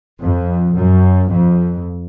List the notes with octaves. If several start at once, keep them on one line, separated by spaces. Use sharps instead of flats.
F2
F#2
F2